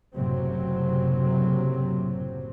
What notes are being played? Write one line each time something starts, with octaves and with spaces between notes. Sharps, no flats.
F#1 A2 C3 F#3 C4